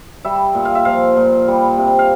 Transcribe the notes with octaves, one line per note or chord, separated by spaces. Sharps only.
G3 E5
A#2
F5
E5
F3 F5
A#2
G3
C3
F5